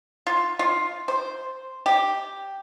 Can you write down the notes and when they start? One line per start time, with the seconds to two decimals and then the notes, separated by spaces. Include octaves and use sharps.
0.27 F4
0.59 F4
1.08 C5
1.86 G4